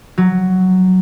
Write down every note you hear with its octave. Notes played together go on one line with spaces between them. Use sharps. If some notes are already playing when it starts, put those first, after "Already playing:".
F#3